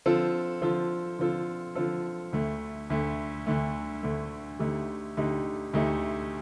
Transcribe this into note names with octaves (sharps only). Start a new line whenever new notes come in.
D3 F3 C4 F4 A4
D3 F3 C4 F4 A4
D3 F3 C4 F4 A4
D3 F3 C4 F4 A4
D2 D3 A3
D2 D3 A3
D2 D3 A3
D2 D3 A3
D2 D3 A3 D#4 G4
D2 D3 A3 D#4 G4
D2 D3 A3 D#4 G4